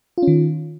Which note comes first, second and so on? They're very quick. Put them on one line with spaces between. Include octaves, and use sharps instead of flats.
F4 C#4 D#3